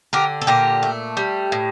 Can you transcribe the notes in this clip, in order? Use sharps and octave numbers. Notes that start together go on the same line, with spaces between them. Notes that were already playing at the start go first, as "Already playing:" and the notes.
D3 G4 A#4
A4
A#2 G4 A#4
A3
G3
A2